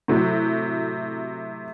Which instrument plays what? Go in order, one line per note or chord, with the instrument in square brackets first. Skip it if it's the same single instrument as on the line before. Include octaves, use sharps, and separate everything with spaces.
[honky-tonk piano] A2 C3 F#3